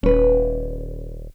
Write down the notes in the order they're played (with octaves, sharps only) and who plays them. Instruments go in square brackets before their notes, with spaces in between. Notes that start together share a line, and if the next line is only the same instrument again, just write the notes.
[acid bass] D#1 [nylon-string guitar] C#4 B4